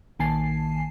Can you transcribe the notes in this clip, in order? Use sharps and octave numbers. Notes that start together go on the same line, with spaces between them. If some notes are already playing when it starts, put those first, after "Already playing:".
A#1 D#3 A#3 G#5 A5 C7